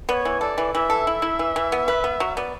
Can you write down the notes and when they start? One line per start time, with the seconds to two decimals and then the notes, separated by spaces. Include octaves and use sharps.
0.09 B3 D5
0.13 C#5
0.25 E3
0.41 A4 D5
0.58 E3
0.73 E3 E5
0.90 A4
1.07 E4
1.22 E4
1.39 E3
1.56 E3
1.72 B3
1.88 B4
2.04 B3
2.20 F#3
2.36 B3 D5